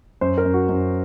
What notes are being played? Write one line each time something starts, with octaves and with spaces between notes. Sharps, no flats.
F#2 C5
A#4
F#2
F#4
F#2